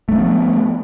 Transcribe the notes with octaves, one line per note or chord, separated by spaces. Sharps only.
F3 A3 B3 D4